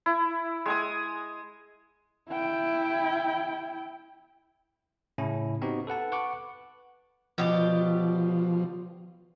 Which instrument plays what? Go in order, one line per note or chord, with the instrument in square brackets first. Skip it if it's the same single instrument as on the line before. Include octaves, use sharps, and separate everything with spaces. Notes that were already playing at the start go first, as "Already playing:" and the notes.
[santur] E4
G#3 G#5 D#6
[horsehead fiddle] E4 G5
[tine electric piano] A2 C#3 C#4 E4
B3 C4 D#4 F#4 G4
A4 B4 F#5 A5
B4 F#5 C#6 D6 F#6
[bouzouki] B2 G4 D5 [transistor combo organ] F3